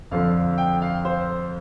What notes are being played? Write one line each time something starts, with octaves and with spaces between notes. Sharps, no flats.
F2 D3 F3 F5
G5
F5
C5